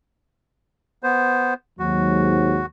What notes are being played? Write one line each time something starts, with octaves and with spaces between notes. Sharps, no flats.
B3 C5
D#2 G#2 F#3 F#4